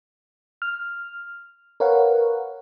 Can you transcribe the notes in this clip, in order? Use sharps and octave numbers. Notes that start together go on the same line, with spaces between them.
F6
A#4 B4 C#5 F5 F#5